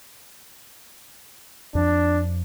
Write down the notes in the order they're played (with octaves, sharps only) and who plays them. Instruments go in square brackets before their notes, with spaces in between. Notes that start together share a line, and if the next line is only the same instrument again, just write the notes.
[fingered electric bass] F2 F3 [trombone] D4